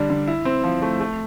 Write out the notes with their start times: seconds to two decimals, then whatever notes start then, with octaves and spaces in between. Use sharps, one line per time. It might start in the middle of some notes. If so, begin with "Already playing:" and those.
Already playing: D3 G3 D4
0.10 D3
0.27 E4
0.45 C4
0.64 F3
0.82 A3
1.00 A3